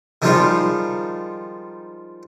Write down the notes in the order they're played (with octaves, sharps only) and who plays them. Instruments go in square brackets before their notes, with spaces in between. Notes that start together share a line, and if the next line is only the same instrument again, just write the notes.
[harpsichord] D#3 F3 G3 G#3 D#4 F4